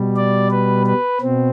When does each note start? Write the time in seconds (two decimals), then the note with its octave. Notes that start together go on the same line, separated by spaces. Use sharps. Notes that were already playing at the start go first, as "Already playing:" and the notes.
Already playing: B2 G3
0.16 D5
0.51 B4
0.87 B4
1.21 B2 C4